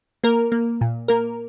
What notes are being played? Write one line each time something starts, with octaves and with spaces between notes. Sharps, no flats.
A#3 A#4
A#3
A#2
A#3 A#4